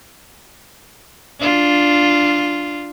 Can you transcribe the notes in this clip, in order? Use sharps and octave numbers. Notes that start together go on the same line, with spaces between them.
D4 F4